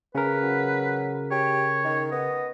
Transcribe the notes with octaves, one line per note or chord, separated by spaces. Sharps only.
C#3 C#4 A#4 B4
F#3
G4 C#5
D#3
B3 D#5